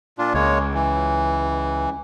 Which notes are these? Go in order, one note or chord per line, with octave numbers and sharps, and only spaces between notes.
A#2 D4 F4
C#2 G#3 A#3 C#5
E3